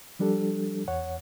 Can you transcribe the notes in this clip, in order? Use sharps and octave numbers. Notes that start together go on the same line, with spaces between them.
F3 G3 D4 G4 A4
E2 C#5 F#5